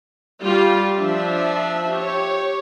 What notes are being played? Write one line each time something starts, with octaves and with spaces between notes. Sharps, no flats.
G3 F4 G4
F3 D4 E5
G4 C#5